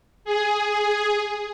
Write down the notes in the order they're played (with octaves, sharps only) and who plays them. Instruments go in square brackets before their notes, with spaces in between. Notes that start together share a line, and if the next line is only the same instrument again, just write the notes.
[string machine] G#4